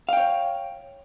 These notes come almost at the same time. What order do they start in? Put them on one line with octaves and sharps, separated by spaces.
F5 G5 C#5